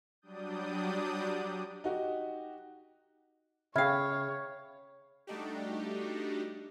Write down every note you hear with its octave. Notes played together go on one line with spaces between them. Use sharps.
F#3 G3 D4 D5 D#6 G6
D#4 F#4 G4
C#3 C#5 E5 F5 G5 B5 F6 G#6
G3 A3 D4 D#4 F#4 G4